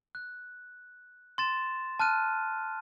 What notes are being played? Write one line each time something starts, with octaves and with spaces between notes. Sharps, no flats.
F#6
C6 A6 E7
A5 F6 F#6 D#7